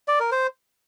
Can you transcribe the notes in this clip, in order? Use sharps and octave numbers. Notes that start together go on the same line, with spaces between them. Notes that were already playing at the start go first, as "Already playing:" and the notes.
D5
A#4
C5